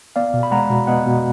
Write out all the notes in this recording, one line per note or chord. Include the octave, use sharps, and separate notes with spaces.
B3 D5 F5
B2
B5
G#3 F#5 A#5
B2
B3 D#5 F#5
B2